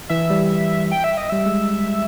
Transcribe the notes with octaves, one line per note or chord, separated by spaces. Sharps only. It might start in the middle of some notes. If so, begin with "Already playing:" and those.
E3 E5
G3
G5
E5
D#5
G3 E5
G#3